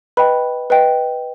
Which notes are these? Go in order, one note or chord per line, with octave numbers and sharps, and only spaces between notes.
B4 D#5 G5 B5
B4 D#5 G5